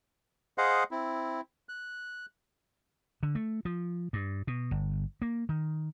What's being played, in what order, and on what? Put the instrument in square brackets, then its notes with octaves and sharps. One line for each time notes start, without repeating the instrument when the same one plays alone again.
[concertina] G#4 C5 D#5 F5 F#5
C4 E4
F#6
[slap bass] D3
A3
F3
G2
B2
G1
A#3
D#3